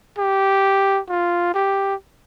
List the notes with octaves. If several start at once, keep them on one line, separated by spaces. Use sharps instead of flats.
G4
F4
G4